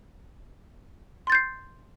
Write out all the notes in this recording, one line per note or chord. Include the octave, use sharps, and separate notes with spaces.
C6 G6 A6 C7